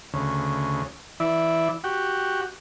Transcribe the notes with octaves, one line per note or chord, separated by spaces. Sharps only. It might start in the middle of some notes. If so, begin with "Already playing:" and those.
D2 C#3
E3 E4 D5
F#4 G4